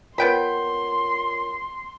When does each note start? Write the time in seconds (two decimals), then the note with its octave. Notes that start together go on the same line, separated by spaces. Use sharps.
0.18 B3 F4 A#4 C#5 G5 B5 C6